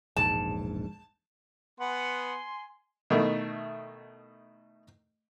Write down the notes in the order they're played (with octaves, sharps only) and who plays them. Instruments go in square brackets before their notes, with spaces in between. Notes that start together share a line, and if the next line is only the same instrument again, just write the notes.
[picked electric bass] E1 A#1 G#2 [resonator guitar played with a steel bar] A5
[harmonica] B3 F#5 [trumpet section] G#5 C6
[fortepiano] B2 D#3 A3 E4